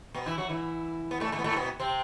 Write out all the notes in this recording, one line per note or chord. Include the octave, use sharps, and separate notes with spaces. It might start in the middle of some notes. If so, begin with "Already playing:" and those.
B2 B3
E3 E4
F#3 F#4
E3 E4
B3
A2 A3
A2 A3
B3
A2 A3
B2 B3
C3 C4